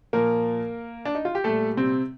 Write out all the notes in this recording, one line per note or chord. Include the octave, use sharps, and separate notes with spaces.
A#2 F3 A#3 A#4
D4
D#4
F4
G4
A#2 G3 A3 A4
C3 C4